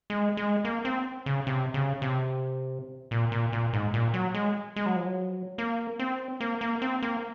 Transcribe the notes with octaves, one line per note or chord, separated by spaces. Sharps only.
G#3
G#3
A#3
C4
C#3
C3
C#3
C3
A#2
A#2
A#2
G#2
A#2
F#3
G#3
G#3
F#3
F3
F#3
A#3
C4
A#3
A#3
C4
A#3